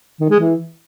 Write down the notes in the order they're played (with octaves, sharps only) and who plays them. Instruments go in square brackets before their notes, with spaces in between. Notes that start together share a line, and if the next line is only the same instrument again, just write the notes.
[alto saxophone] D#3
G#3
E3